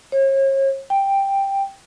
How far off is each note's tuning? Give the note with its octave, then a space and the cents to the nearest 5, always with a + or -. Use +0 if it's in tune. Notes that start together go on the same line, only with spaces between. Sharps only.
C#5 -40
G5 +5